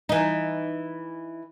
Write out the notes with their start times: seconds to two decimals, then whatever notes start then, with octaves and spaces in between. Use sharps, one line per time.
0.09 E3 D#4